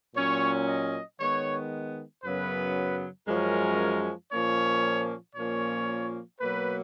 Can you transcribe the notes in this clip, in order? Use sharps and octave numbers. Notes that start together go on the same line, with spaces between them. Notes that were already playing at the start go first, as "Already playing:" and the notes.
A#2 F#3 C#4 C#5
D#5
D#3 G#3 B3 C#5
F#2 C#3 F#3 B3 B4
F#2 F3 G#3 C#4 A#4
A#2 F3 A#3 C#4 C#5
A#2 F3 A#3 C#4 C#5
B2 F#3 A#3 B4